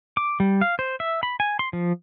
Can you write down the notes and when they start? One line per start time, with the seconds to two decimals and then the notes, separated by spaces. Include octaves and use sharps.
0.17 D6
0.40 G3
0.61 F5
0.79 C5
1.00 E5
1.23 B5
1.40 G#5
1.59 C6
1.73 F3